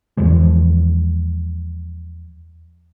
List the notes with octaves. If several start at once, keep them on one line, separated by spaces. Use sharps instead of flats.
E2 E3 F3 G#3